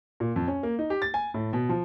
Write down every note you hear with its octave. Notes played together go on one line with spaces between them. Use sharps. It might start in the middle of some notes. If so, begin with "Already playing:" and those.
A#2
F2
C#4
A#3
D#4
G4
A6
G#5
A2
B2
F3